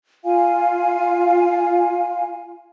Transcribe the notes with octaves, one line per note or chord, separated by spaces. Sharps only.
F4 F5 G#5